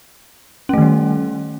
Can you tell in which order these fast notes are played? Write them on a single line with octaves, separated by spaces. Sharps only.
C#4 A3 D#3 G3